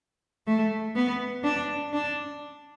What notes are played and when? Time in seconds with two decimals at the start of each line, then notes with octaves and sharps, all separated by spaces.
0.47 A3
0.95 B3
1.44 D4
1.93 D4